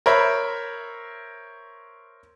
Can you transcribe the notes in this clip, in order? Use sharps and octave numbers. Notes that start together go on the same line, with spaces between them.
A#4 C5 C#5 E5 B5